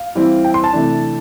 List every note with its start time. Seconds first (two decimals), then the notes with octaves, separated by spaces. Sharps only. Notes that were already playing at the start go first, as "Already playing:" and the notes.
Already playing: F5
0.15 E3 G3 C4 E4
0.44 G5
0.54 C6
0.64 A5
0.73 C3 E3 A3 D4